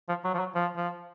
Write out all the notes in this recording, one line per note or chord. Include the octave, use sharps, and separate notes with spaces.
F3
F#3
F3
F#3
F3
F3